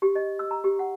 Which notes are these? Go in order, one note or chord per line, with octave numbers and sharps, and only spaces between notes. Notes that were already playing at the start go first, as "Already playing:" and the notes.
G4
D#5
E6
A#5
G4
F#5